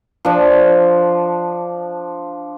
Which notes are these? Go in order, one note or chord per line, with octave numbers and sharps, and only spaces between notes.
F3 D4